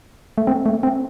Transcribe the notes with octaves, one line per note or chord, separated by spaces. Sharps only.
A3
C4
A3
C4